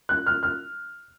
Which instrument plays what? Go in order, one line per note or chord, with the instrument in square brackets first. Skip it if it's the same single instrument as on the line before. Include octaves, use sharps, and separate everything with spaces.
[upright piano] F#6
F6
F6